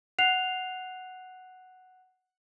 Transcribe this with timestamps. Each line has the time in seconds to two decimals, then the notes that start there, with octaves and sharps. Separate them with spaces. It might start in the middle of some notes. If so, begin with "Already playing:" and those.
0.19 F#5 F#6 C7 F7